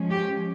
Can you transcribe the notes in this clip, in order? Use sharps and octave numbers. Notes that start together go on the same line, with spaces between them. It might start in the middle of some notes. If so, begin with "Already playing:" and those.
Already playing: F3 G#3 C#4
G4